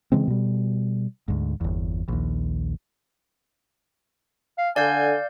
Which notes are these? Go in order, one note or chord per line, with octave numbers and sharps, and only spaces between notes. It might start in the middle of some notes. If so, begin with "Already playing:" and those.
C#3 E3 G#3 C4
B2 G3
D2 G#2
G1 E2
A#1 D#2
F5
D3 D5 F5 G#5 G6